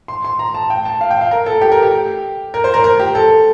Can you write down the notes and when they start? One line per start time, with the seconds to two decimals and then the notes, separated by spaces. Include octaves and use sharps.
0.08 C6
0.25 C6
0.39 A#5
0.54 A5
0.70 G5
0.85 A5
1.01 F5
1.11 G5
1.21 F5
1.31 A#4
1.46 A4
1.61 G4
1.72 A#4
1.83 G4
2.54 A#4
2.64 C5
2.74 A#4
2.84 A#4
2.99 G4
3.15 A4